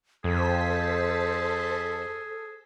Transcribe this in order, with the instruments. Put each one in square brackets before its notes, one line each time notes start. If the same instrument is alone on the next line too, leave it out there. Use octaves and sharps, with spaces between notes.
[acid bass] F2 [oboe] G#4 [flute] A4 [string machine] C5 A5 B6